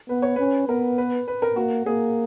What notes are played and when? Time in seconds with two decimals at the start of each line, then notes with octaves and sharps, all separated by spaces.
0.09 B3 B4
0.22 C#5
0.36 C#4 B4
0.68 B3 A#4
0.98 B4
1.28 B4
1.42 A#4
1.56 A#3 F#4
1.86 A#3 G#4